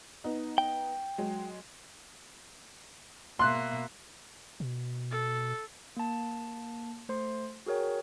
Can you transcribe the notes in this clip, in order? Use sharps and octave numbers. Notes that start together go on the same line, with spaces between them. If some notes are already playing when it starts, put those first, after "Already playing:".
B3 D#4
G5
F#3 G#3
B2 A#3 E5 C6 F#6
B2
A4
A#3 A5
A3 C5 C6
F#4 G#4 A#4 C#5 G5